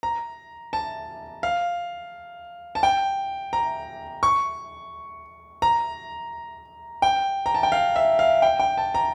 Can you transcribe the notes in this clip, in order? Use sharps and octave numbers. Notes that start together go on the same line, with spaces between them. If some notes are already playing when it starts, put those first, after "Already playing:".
A#5
A5
F5
A5
G5
A#5
C#6
A#5
G5
A#5
A5
G5
F5
E5
F5
G5
G5
A5
A#5